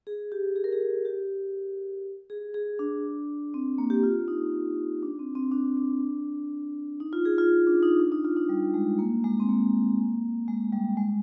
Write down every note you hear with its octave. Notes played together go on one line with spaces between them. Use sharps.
G#4
G4
G#4
A#4
G#4
G4
G#4
G#4
D4
C4
A#3
G4
F4
D#4
D4
C4
C4
D4
D4
D#4
F4
G#4
F4
D4
D#4
D4
D#4
F4
D#4
G3
G#3
A#3
G#3
C4
A#3
G#3
G3
G#3